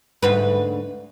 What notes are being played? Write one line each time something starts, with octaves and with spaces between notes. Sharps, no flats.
D2 G#2 B4